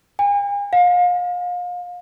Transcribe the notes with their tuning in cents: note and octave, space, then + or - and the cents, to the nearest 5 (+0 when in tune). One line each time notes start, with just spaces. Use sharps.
G#5 -45
F5 +35